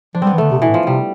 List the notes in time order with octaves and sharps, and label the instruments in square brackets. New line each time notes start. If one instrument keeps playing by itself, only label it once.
[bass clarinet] F3 [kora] D4
[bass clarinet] G3 [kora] C4
[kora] B3
[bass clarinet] E3
[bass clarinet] D3 [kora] A3
[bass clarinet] C3
[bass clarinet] B2 [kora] E3
[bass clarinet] A2
[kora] F3
[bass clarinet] C3 [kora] G3